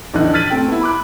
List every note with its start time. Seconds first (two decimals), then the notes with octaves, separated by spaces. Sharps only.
0.14 A#1 E2 D3 D#4 F#6
0.34 F6 G#6 A6 B6 D#7 F#7
0.50 A3 C4 A4 G5
0.68 B3 E4
0.81 B5 D6 F#6